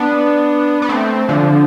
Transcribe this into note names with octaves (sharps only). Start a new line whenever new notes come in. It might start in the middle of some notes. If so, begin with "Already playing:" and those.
Already playing: B3 D4
B3
A3 C4
D3 F3